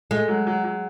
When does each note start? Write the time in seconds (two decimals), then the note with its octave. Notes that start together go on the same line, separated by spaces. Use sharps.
0.11 G#3 A3
0.28 F#3
0.47 F#3
0.64 F#3